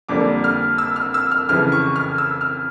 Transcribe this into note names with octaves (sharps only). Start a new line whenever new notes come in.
F2 D3 G3 A#3 D4 D6
F6
E6
F6
E6
F6
F2 C#3 E3 F6
C#6
F6
E6
F6